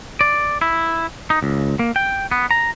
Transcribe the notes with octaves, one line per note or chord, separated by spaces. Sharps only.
D5
E4
D#4
C#2
A#3
G5
B3
A#5